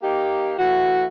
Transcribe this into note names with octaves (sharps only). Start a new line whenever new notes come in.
A#3 D#4 G4
E3 A3 F#4